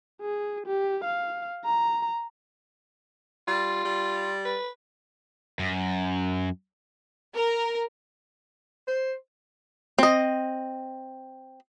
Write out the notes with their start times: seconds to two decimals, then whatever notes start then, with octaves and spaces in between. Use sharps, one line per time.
0.22 G#4
0.66 G4
1.04 F5
1.65 A#5
3.48 G3 F4
3.85 G3
4.45 B4
5.59 F#2
7.34 A#4
8.88 C5
9.99 C4 D#5